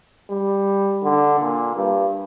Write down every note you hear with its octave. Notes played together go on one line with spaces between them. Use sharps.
G3
D3
A#2
G2